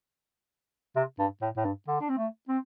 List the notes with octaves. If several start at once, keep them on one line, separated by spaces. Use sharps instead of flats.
C3
G2
A2
A2
G2
D3
D4
C4
A3
C4